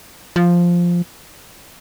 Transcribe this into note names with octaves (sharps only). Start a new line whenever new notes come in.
F3